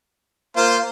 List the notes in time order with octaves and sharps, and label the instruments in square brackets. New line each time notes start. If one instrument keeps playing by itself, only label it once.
[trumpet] A#3 [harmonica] F4 C5